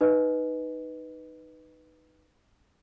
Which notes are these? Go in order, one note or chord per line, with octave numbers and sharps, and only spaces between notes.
D#4 B4 D#5